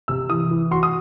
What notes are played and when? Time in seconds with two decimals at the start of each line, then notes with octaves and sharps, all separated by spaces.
0.08 C3 E6
0.29 E3 D#6
0.51 E3
0.71 F#4 C6
0.83 D#6